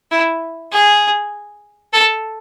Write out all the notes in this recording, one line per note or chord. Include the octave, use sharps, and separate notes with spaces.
E4
G#4
A4